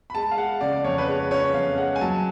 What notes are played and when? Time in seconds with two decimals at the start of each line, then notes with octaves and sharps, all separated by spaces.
0.10 B5
0.15 G#3 A5
0.31 F5
0.37 G#3 F#5
0.61 C#3 D5
0.73 D5
0.84 F2 C#5
0.98 B4
1.08 G#3 C#5
1.31 C#4 C#5
1.54 F2 F5
1.78 G#3 F#5
1.96 G#5
2.01 F#3 A5